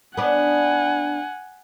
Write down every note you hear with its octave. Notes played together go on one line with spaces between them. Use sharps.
B3 D4 F#5 G#5